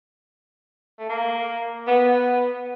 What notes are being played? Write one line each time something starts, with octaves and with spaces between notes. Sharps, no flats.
A3
A#3
B3